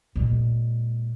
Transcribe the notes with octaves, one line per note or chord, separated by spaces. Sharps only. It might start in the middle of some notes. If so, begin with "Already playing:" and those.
A#2 G#3